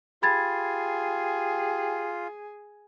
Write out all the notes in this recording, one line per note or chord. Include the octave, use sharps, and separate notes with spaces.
F4 G4 G#4 B5 G#6 A6